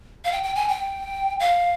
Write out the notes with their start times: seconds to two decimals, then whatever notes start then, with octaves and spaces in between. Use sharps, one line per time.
0.24 F5
0.32 G5
0.43 G5
0.55 G#5
0.68 G5
1.40 F5